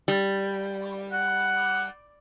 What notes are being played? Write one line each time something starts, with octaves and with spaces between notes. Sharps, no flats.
G3
F#5